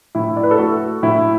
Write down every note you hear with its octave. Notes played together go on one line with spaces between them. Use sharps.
A2 E4
D5
B4
A4
A3 F#4
A2 E4